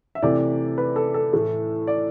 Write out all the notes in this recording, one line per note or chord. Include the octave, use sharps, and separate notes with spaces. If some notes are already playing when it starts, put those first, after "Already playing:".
E5
C3 E3 A3 D5
B4
A4
A4
A2 E3 A3
D5